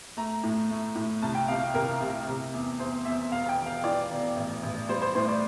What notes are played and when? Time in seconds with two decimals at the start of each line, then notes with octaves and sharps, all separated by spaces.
0.17 A3 A#5
0.43 A2
0.70 A3
0.95 A2
1.22 C2 A5
1.35 G5
1.48 C3 F5
1.74 C2 A#4
2.01 C3
2.27 C3
2.53 E2
2.79 E2 C5
3.05 E2 E5
3.31 E1 F5
3.49 G5
3.57 E1
3.66 F5
3.84 E3 D5
4.11 E1
4.36 A1
4.63 A1
4.89 G3 C5
5.02 C5
5.15 A2 C5
5.28 D5